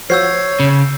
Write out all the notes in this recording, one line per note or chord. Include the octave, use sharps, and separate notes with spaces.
F3 F#4 C#5 E6 G6 C7
C#3